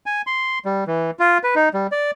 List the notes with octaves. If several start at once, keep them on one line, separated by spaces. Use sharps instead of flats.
G#5
C6
G3
E3
F4
B4
D#4
G3
D5